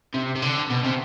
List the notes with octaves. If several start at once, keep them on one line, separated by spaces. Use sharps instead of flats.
C3
C3
D3
B2
C3